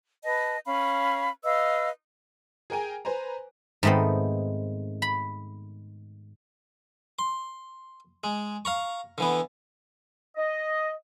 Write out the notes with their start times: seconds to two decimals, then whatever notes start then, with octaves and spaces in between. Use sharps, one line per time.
0.24 B4 D#5 A5
0.66 C#4 F5 B5
1.44 B4 D#5 F5 E6
2.70 G#4 A#4 G5 G#5 A#5
3.05 B4 C5 G#5 A#5
3.83 G#2 D#3 A3 B3 C4
5.02 B5
7.19 C6
8.24 G#3
8.65 F5 A#5 C#6
9.18 D3 E3 B3
10.37 D#5